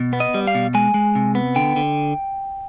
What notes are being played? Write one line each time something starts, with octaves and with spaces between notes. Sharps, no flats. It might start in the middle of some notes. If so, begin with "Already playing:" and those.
Already playing: B2
B3
D#5
G3
F5
B2
G#3 G#5
G#3
C3
B3
D3 G5
D3